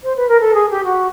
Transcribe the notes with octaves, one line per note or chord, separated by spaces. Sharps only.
C5
B4
A#4
A4
G#4
G4
F#4